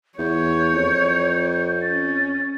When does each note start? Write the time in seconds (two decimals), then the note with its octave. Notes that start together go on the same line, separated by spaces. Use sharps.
0.19 E2 C#5 G6
0.73 F2
1.82 C#4 A6